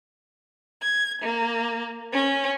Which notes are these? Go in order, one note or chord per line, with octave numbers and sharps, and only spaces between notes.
G#6
A#3
C#4